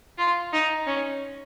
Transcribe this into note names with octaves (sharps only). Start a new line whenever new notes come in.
F4
D#4
C#4